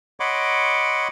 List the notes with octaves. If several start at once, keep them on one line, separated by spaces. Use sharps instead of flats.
C#5 D#5 F#5 B5 C6 D6